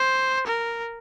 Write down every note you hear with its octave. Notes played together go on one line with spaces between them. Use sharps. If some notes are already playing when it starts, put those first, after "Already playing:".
Already playing: C5
A#4